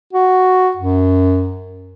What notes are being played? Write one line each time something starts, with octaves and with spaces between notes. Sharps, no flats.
F#4
F#2